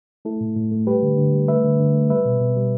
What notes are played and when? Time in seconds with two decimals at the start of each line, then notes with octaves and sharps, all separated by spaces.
0.25 A3 E4 A4
0.41 A2
0.56 A2
0.71 A3
0.87 G3 G4 B4
1.03 D3
1.18 D3
1.33 G3
1.48 A3 B4 E5
1.64 D3
1.80 D3
1.95 A3
2.10 G3 B4 E5
2.25 B2
2.41 B2
2.56 G3